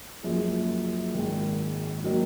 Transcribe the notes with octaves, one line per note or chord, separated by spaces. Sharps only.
F#1 F#2 F3 G#3
G#1 G#2 D#3
D#3 F#3 A#3 D#4